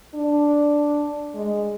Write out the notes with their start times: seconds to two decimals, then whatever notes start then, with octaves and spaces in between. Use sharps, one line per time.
0.15 D4
1.35 G#3